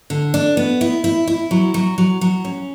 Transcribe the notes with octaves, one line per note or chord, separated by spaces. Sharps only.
D3
D4
B3
E4
E4
E4
F#3
F#3
F#3
F#3
C#4